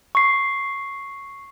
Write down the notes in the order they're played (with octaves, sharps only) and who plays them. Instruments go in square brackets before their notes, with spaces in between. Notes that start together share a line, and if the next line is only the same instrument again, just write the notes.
[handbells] C#6 C7